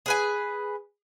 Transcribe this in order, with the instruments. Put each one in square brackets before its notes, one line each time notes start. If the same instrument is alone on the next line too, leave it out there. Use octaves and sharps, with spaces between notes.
[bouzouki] G#4 B4 G#5